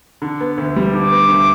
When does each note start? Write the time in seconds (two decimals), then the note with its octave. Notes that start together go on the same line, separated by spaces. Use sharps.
0.22 D3
0.40 B3
0.58 D2
0.76 G3
0.93 D3 D6
1.11 B3
1.29 D2